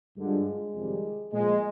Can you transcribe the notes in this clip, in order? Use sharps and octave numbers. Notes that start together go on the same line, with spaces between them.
G2 D3 F3 G#3
F2 C3 D#3 G3
A#2 F3 G#3